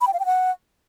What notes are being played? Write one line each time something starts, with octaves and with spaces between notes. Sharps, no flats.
B5
G5
F5
G5
F#5